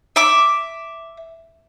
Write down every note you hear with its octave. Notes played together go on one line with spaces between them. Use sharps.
E5 D6